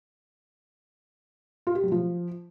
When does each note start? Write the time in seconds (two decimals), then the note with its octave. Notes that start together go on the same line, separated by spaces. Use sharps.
1.67 F4
1.75 G4
1.83 F#3
1.92 F3